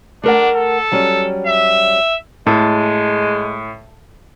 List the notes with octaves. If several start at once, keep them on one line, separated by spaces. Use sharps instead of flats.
A3 D4 A#4 F#5
A4
F#3 G3 C#4
E5
A2 G#3 A4